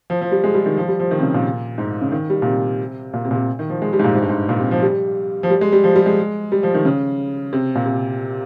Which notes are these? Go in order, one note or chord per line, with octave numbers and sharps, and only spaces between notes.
F3
F3
G3
G#3
G3
D#3
F3
G3
F3
D#3
C3
C#3
A#2
G#2
C#3
D#3
G3
A#2
C3
A#2
C3
A#2
C3
D#3
F3
G#3
G3
G#2
A#2
G#2
G2
G#2
A#2
C3
F3
G3
F3
G3
G#3
G3
F3
G3
G#3
G3
F3
D#3
C#3
C3
A#2
C3